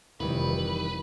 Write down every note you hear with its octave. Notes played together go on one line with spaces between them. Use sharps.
F1 D#3 E3 G3 B4